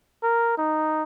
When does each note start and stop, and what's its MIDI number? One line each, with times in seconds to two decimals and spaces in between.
0.23 0.56 70
0.58 1.03 63